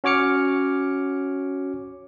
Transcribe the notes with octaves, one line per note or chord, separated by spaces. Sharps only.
C#4 F#4 C#5 D6 F6 C#7